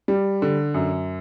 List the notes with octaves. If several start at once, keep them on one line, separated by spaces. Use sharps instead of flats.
G3
D3
F#2